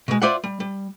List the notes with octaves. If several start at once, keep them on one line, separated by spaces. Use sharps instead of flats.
B2 G#3
F4 C5 D5 E5 F#5
G3
G3